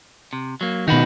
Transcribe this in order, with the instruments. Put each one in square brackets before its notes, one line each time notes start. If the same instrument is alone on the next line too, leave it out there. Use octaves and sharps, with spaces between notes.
[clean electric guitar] C3
F#3 A#3
[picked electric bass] B2 D#3 [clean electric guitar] D#4 F#4 B4